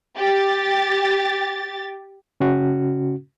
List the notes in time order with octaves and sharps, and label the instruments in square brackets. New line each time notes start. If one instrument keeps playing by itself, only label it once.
[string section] G4 A6
[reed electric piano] C#3 C#4 F#4